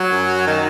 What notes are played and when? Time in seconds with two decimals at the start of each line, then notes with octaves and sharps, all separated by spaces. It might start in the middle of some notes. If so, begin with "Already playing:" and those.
Already playing: F#3
0.11 F#2
0.47 D#3